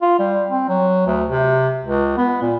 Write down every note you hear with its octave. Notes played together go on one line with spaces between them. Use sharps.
F4
G3
C4
F#3
D2
C3
C#2
B3
A#2